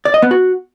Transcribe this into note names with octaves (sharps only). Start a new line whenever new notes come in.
D5
D#5
B3
F#4